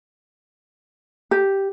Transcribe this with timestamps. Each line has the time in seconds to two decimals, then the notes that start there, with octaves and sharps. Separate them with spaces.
1.31 G4